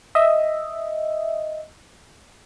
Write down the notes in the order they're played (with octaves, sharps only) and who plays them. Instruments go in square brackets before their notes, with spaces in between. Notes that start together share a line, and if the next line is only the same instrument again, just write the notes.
[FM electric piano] D#5 E5